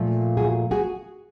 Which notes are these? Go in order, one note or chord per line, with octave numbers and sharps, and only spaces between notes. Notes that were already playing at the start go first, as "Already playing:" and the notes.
Already playing: A#2 F3 A3
F#4 G#4
F#4 G#4